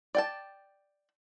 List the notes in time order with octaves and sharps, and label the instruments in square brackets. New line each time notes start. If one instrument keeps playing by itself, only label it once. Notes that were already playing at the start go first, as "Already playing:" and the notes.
[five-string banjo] D5 G5 A5